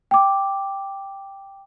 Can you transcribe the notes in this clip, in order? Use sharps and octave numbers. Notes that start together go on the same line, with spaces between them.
G5 D6